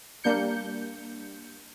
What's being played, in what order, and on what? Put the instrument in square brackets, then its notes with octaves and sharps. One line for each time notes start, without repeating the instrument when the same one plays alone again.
[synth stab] G3 A#3 D4 G6 C#7